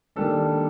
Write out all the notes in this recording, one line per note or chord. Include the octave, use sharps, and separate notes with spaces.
D#3 G3 A#3 D4 A4